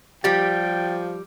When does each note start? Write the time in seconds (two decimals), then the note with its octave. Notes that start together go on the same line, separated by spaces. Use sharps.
0.24 F3 G3 G4 G5 A6